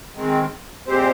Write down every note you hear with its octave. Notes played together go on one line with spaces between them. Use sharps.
D#3 G#3 C4
A#2 G#3 C4 G4 C5